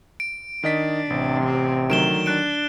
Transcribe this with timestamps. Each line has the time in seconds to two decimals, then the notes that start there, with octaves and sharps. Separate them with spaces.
0.20 D7
0.63 D#3 D4 D#5 B6
1.10 A1 C3
1.44 C4
1.90 D3 D#3 F#3 A3 D7 E7 G7
2.26 D4 F#6 D7